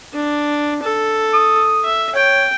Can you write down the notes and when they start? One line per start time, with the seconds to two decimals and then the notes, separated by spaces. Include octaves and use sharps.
0.14 D4
0.83 A4
1.34 D#6
1.85 E5
2.15 C#5 G5